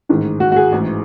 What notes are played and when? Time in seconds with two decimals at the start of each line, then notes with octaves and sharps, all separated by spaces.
0.09 A1 G#2 D#3
0.40 F#4
0.52 F#4
0.56 G#4
0.72 A1 G#2 E3